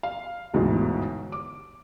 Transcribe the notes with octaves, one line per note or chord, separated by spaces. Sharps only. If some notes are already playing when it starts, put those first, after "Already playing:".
F5
G1 D2 G#2 B2 E3
D6